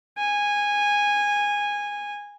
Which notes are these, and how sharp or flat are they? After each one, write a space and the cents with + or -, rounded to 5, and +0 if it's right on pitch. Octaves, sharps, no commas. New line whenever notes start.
G#5 -15